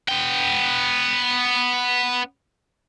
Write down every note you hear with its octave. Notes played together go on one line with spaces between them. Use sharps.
B3 G5